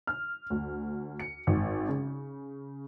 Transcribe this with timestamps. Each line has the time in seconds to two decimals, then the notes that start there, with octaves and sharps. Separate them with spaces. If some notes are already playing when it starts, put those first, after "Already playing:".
0.07 F6
0.50 D2
1.19 C#7
1.47 G#1
1.88 C#3